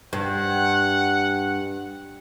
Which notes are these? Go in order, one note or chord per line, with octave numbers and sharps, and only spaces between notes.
G2 F#5